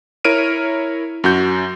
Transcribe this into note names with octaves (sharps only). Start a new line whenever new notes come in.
E4 A#4 C#5 F6 D7 D#7
F#2 F#4 G6